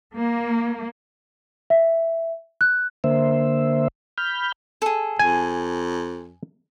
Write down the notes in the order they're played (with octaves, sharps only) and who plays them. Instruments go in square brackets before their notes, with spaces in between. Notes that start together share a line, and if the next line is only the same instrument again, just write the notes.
[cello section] A#3
[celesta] E5
F#6
[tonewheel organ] D3 A#3 C5 E5
B5 F6 G6
[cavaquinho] G#4 A4
[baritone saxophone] F2 [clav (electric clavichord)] G#5